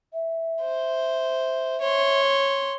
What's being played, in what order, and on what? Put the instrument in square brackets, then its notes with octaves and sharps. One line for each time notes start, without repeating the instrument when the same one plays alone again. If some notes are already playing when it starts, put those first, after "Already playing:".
[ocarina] E5
[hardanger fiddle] C5
C#5 C6